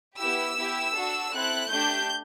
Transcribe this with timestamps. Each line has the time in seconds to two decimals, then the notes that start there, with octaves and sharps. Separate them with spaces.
0.19 B3 E4 G4 E6
0.57 B3 E4 G4
0.94 D4 F#4 A4
1.32 C4 E4 A4 F#6
1.70 A3 D4 G4 G6